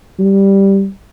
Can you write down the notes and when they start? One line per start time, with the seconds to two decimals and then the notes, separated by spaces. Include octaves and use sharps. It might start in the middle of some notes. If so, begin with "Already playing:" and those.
0.19 G3